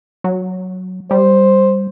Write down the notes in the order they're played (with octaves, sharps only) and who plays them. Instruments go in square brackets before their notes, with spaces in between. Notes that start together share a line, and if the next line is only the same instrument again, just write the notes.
[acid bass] F#3
[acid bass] G3 [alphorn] C5